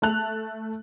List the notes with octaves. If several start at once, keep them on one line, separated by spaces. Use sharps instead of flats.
A3 A5 F#6 F7